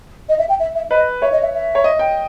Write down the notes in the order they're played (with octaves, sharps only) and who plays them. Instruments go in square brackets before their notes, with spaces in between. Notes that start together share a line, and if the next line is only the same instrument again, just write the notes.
[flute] D#5
E5
G5
E5
E5
[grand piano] B4 [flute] D#5
[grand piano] C#5 [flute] E5
[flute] D#5
E5
E5
[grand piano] C#5
D#5
G5